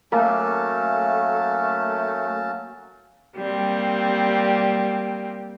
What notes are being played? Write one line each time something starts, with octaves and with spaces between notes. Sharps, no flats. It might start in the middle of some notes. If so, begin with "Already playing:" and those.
F#3 A3 A#3 C#4 A5
G3 A#3 C4